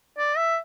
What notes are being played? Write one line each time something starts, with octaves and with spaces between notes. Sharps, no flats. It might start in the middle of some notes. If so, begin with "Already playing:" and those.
D5
E5